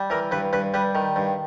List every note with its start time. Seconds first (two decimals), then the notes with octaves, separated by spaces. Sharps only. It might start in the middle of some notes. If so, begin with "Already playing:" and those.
Already playing: G3
0.10 E3 A#4
0.31 G2 B4
0.53 G2 B4
0.74 G3 B4
0.95 D#3
1.16 G2